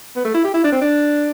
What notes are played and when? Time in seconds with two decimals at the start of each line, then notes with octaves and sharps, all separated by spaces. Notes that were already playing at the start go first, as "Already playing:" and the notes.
0.16 B3
0.25 A3
0.34 E4
0.45 G4
0.54 E4
0.64 D4
0.72 C4
0.81 D4